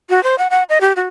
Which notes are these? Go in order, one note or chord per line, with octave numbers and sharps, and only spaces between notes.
F#4
C5
F#5
F#5
D#5
G4
F#4